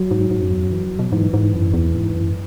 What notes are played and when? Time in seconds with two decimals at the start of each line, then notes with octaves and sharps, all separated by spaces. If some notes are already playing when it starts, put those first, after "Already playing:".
Already playing: F#3
0.11 G#2
0.31 G#2
0.41 F#2
0.51 E2
0.62 F#2
0.72 E3
0.99 B2
1.12 G#2 E3
1.34 G#2
1.54 F#2
1.73 E2
1.94 G#2
2.14 F#2